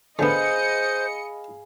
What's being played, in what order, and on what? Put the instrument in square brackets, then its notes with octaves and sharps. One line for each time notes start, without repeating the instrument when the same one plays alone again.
[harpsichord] D3 B3 [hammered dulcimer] G#4 F5 B5 [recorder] C5 [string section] D#5 C#7